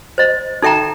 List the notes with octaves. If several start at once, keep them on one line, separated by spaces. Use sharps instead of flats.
C5 D#5
D#4 A4 E5 G5 A#5